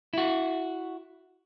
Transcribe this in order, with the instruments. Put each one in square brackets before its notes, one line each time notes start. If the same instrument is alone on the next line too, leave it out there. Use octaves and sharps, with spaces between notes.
[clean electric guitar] E4 F#4